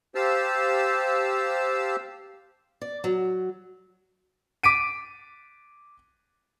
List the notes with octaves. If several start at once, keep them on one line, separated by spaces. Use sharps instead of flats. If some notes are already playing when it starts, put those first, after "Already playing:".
G4 C5 F5 A5 E6
D5
F#3
D6 B6 D7 D#7